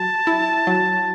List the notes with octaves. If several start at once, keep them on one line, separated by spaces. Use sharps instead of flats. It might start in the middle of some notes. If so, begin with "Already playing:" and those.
Already playing: F#3 A5
E4
F#3